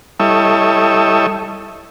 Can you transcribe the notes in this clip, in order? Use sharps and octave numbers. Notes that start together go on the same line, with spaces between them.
G3 E4 A4 C#5 D#5 E5